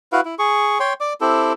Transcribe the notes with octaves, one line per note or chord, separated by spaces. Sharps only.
E4 F#4 B4 F5
E4
G#4 C#6
C#5 G5 C6
D5 D6
C4 E4 G4 A4